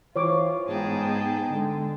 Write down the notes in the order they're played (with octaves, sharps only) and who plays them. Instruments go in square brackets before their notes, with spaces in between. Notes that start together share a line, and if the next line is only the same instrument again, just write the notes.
[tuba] E3 [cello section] F4 [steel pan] C5 C#5 D6
[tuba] G#2 [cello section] B3 D#4 G#4 [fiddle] G5 A5
[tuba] D3 [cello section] G#3